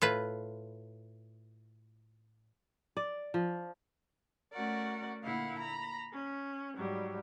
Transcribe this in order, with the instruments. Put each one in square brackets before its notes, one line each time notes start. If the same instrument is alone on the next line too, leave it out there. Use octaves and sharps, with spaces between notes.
[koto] A2 F4 B4
[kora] D5
F3
[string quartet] A3 C#4 F#4 A#4 D5 F#5
A#2 D3 A#3 E4 F5 F#5
A#5 B5
C#4
G#2 F#3 G3